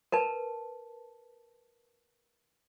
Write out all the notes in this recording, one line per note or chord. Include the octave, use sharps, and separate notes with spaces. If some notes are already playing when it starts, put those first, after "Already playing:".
A#4 B4 A5